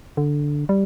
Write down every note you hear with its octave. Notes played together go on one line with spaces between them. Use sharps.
D3
G3